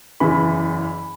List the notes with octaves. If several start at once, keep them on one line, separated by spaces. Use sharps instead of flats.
F#1 E2 C#3 E3 B5